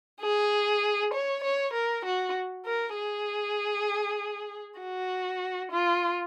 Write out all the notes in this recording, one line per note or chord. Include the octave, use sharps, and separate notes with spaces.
G#4
C#5
C#5
A#4
F#4
A#4
G#4
F#4
F4